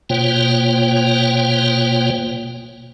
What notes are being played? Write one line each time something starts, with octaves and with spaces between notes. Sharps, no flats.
B2 A#3 F4 C5 C#5 G5